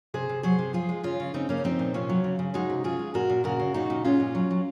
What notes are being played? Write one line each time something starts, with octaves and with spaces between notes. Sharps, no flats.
C3 G#4 C5
C3
F#3 G#4 C5
C3
F3 F4 G#4
G#3
C#3 C#4 F4
C#3
C#3 C4 D#4
C#3 A#3 C#4
F3 C4 D#4
A#2
C3 C#4 F4
F#3
C#3
C#3
G#3 D#4 F#4
C3
C#3 F4 G#4
G#3
A#2 F#4 A#4
A#2
C#3 F#4 A#4
C#3
A#2 D#4 F#4
A#2
G#3 C#4 F4
A#2
F#3
F#3